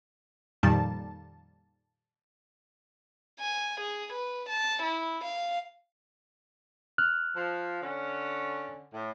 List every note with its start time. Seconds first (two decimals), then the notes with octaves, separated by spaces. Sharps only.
0.63 F2 A#2 D#3 G3 A5
3.40 G#5
3.81 G#4
4.13 B4
4.49 A5
4.82 E4
5.24 F5
6.98 F6 F#6
7.36 F3
7.82 D3 C#4
8.93 A2